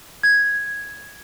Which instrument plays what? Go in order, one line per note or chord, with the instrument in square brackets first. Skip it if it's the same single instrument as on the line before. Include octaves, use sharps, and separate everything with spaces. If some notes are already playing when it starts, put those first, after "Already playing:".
[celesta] G#6